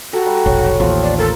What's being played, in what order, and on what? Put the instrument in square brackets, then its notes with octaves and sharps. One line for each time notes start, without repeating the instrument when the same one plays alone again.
[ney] F#4 [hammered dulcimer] G4 A4 A#5
[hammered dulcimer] G3
[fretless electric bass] F1 B1 [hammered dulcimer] C#5
[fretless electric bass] A1 D#2 [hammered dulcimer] F3
[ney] D5
[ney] A4 [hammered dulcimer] A#4 C6